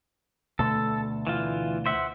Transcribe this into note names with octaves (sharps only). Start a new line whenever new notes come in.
D2 B2 A3 A4
E3 F4
C5 E5 F#5